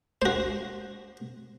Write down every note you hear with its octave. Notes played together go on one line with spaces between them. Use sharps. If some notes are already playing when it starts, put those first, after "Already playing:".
F#4 C5